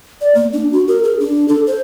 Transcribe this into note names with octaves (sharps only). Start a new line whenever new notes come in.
D5
A#3
D4
F#4
A#4
G#4
D4
A4
C5